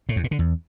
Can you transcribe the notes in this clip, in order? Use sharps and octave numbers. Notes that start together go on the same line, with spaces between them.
A2
E2
A#2
D3
E2